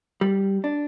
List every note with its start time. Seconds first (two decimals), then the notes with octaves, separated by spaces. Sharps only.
0.21 G3
0.64 D4